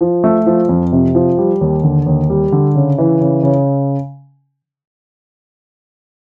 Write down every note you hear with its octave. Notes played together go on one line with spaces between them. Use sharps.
F3
A3
F3
F2
C3
F3
G3
D#2
D3
D#2
G3
D3
C#3
E3
C#3
C#3